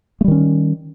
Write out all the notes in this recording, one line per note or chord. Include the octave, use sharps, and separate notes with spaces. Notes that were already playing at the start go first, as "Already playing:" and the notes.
D#3 G3 A3 C#4